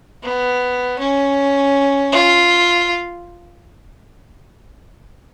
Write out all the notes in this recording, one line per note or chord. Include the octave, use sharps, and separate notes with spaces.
B3
C#4
F4